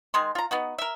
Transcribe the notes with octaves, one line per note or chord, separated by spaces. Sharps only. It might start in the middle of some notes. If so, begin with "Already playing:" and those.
D#3 G#3 C6
F4 A#5
B3 D#4 F#4
A#4 E5